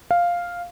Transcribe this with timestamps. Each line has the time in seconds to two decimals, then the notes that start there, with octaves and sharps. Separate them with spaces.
0.11 F5